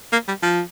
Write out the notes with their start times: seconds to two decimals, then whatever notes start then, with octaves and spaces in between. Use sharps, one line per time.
0.13 A#3
0.28 G3
0.43 F3